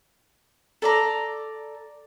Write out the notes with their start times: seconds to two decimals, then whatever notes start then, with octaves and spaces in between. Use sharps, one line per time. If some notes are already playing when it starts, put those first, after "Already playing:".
0.82 A4 D5 A#5